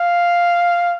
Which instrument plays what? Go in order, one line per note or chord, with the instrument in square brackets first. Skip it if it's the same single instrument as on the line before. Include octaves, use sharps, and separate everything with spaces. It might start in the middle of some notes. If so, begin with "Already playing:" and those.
Already playing: [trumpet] F5